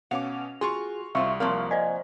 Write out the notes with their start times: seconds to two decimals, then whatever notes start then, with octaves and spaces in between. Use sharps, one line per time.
0.11 B2 C#4 F5 F#5 D6 F7
0.61 F4 F#4 G#4 C6 C#6
1.15 C2 C4 F4 C5 E5 F5 C#6
1.40 F3 A#3 C4 A#4 F5 A#5 C#6
1.71 C5 D5 D#5 G#5